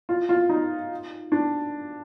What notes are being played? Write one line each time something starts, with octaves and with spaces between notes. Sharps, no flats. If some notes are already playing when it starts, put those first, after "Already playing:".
F4
F4
D#4
D4